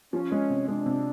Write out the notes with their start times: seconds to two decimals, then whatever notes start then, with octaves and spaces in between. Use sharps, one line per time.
0.13 F3 C#4
0.32 G#3
0.50 C3
0.68 G#3 D4
0.86 C3